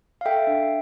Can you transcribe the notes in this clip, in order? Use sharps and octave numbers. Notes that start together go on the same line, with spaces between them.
F5
A4 E5 G5
D4